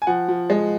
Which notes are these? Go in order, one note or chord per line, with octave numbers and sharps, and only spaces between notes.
G#5
F3 F#5
F3
G#3